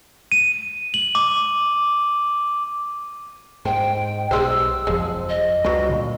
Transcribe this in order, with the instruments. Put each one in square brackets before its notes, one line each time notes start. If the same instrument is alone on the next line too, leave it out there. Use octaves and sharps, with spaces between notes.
[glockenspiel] D#7
F#7
D6
[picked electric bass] G#2 [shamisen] C5 [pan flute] G5
[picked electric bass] B1 [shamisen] G3 G#3 C5 [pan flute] E6
[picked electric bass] F#1 F2 F3 [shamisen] G#3
[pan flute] D#5
[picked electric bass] C#2 G3 [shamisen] F#3 F4 B4
[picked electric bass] A#2 D3